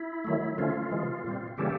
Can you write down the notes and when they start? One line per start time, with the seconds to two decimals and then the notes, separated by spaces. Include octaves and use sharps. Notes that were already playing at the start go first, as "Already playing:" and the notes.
Already playing: E4
0.24 D#3 F#3 A3
0.58 D3 F3 A3 C#4 F4
0.91 C3 E3 G#3
1.24 A#2 G3 C4
1.57 C#3 E3 G3 A#3 C#4 G4 A4